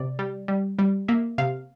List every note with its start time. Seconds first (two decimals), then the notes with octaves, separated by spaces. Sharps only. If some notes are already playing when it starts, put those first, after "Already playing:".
Already playing: C3 D5
0.19 G3
0.48 G3
0.79 G3
1.08 A#3 E5
1.38 C3 F5